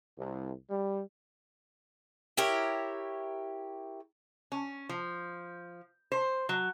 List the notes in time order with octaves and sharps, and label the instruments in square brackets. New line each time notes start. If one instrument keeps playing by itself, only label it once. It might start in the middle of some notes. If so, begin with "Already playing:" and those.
[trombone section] C2
G3
[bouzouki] E4 G4 A#4 C#5
[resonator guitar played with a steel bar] C#4
F3
C5
F#3